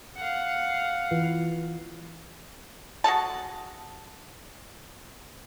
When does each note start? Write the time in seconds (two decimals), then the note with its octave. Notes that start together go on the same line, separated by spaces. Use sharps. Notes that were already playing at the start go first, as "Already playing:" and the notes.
0.17 F5 F#5
1.11 E3 F4 B4
3.04 F#4 G#4 A4 A5